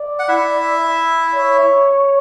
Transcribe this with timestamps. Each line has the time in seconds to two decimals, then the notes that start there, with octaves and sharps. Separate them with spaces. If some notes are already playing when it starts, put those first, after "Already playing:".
Already playing: D5
0.19 F#5
0.28 E4 E5
1.33 C#5